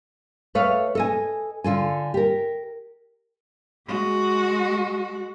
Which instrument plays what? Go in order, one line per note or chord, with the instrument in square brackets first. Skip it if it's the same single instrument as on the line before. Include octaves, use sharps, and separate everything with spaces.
[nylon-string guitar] A3 B4 C#5 F5
A4 D#5 G#5
D3 F4 A4 G#5
G4 A#4
[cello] G#3 F#4